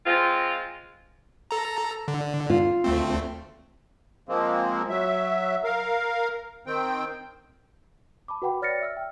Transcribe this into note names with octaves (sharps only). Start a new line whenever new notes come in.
G#3 C4 F4
A4 A#5
D3
F4
D2 A3 C4
F3 G#3 A#3 C4
F#3 E5
A#4 F5
D#3 C4 G5
A5 B5 D6
F#4 B4 F#5 G5 B5 D6
C#5 D5 F6 A6 A#6 C#7
E5 E6 F6
G5